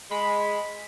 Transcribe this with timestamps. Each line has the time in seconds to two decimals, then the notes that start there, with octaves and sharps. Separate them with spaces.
0.11 G#3 B5